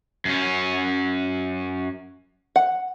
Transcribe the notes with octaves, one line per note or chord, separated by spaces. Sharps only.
F#2 C#4
F#5